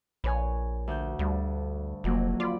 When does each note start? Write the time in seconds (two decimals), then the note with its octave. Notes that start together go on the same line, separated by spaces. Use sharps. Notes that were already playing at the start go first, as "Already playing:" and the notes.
0.24 A#1 B4 C#5 G#5
0.87 D2 G6
1.19 D2 G2
2.04 F1 F2 F#3 A#3
2.40 F4 D5 B5